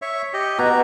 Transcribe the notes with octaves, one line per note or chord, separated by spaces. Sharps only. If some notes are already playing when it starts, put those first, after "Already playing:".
C#5 E5 C#6
G4 D#5
B2 F#4 A#5